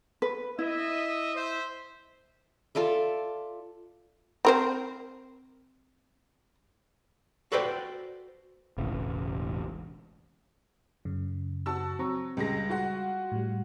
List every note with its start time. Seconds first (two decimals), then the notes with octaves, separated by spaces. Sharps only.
0.22 B4
0.59 E4 D#5 E5
1.34 C5 E5
2.75 F4 A4 D5 E5
4.45 C4 A#4 C5
7.52 F#4 A4 B4 C5 D5 G5
8.78 E1 A1 C#3
11.05 F#2 C#3
11.66 F#4 A5 E6
11.99 F#3 C4 A#5 C#6
12.37 C#2 G3 G#3 A#6
12.69 F4 F#4 F#5
13.32 A2 G3